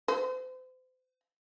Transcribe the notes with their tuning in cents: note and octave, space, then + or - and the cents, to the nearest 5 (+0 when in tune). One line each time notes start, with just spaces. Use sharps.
C5 -40